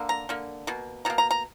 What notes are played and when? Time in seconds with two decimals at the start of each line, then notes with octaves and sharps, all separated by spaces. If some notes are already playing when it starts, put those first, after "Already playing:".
Already playing: D3 A#3
0.09 A#5
0.29 D3 A#3
0.67 B2 A#3
1.05 B2 A#3 A#5
1.18 A#5
1.31 A#5